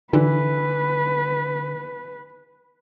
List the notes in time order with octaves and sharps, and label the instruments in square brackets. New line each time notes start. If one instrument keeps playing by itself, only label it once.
[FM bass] D3 [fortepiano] E3 [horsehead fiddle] B4